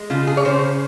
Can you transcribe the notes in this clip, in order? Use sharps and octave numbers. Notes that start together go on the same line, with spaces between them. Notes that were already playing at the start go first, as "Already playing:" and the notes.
Already playing: G#3
C#3 F4
G#4
C#5
C#3 C5